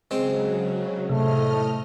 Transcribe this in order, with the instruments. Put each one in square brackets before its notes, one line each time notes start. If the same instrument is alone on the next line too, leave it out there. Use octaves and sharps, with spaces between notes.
[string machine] C#3 F#3 [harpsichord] G#3 C4
[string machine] A2 D#5 F6 [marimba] C3 [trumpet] A3